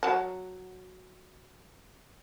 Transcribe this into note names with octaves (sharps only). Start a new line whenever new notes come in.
F#3 A5